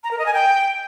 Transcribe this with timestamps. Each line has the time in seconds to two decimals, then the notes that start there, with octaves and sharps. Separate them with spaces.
0.03 A#5
0.11 A#4
0.18 D#5
0.26 G#5
0.33 G5